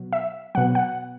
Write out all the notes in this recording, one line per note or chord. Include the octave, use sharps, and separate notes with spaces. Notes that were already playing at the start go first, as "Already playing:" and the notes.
Already playing: B2 F#3
E5
B2 F#3 F#5
F#5